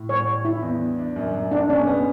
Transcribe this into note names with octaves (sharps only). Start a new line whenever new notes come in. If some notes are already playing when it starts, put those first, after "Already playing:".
Already playing: A2
G3 C#5
G3
G3 E4
E2
D4
D4
F#2
F#2
G3 D4
B2 C#4
B3